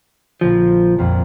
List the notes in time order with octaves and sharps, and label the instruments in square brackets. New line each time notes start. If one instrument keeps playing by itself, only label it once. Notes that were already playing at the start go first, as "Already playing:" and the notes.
[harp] A#1 D3 A#6 [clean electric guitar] F3
[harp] A#1 F2 G3